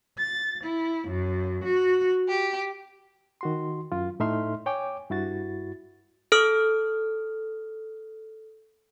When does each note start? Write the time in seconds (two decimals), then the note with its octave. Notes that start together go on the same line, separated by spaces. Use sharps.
0.18 A6
0.64 E4
1.08 F#2
1.65 F#4
2.28 G4
3.41 D#3 F#4 C6
3.92 F#2 F4
4.20 A2 A3 D#4 E5 C6 F6
4.66 C#5 G5 G#5 D6
5.10 G2 E4 F#4 A6
6.32 A4 D#6 F6